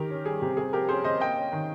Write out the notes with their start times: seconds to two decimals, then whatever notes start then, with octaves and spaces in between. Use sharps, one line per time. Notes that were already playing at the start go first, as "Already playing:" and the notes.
Already playing: D#3 G4 A#4
0.10 C#4
0.25 G3 G#4
0.42 C3 G4
0.57 C3 G#4
0.73 F3 G4 A#4
0.89 C#4 G#4 C5
1.04 C3 C5 D#5
1.20 A#3 D#5 G5
1.37 C#4
1.53 D#3